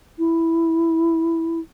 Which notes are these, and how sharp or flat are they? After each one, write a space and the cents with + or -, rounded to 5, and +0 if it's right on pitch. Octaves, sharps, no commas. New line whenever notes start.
E4 +0